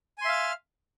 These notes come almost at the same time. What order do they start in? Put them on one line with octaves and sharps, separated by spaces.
G#5 C6 E5 F5 F6